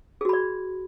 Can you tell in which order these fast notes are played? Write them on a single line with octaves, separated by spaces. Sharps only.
G#4 F#4 B5 D5